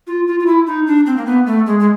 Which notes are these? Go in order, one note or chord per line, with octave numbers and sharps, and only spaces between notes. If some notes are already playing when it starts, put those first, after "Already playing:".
F4
F4
F4
E4
D#4
D4
C4
A#3
B3
A3
G#3
G#3